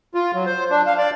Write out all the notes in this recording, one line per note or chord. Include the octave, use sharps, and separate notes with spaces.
F4
F#3
C5
D4
F5
D5